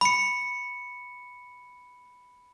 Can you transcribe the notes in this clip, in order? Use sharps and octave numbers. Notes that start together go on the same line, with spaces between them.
B5 C#7